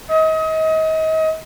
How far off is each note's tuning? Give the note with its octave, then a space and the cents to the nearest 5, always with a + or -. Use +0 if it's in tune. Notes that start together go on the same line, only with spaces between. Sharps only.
D#5 +35